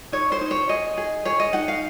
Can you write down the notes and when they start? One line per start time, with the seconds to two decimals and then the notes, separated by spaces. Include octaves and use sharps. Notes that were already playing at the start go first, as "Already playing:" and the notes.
0.12 D#4 C#5
0.32 C5
0.41 D#4
0.51 C#5
0.69 G#4 D#5
0.97 G#4
1.25 G#4 C#5
1.40 D#5
1.53 D#4 F#5
1.68 F5